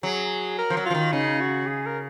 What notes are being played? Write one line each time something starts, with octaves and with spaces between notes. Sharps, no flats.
F#3 G#4
A#4
F3
F#3
F4
F3
D#3
C#3 D#4
F#4
G#4
A#4